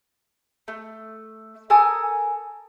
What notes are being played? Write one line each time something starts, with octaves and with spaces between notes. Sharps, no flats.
A3
A4 A#4 G#5 D#6